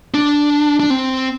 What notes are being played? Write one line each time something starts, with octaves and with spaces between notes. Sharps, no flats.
D4
D4
C4